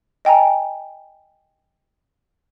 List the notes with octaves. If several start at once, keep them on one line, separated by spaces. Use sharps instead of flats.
D#5 G5 G#5 A#5